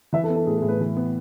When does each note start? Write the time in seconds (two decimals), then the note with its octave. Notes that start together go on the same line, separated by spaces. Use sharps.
0.13 E3 E5
0.24 A4
0.29 B3
0.35 A4
0.46 A2 G#4
0.58 G#4
0.62 A2
0.68 B4
0.80 E3
0.97 B3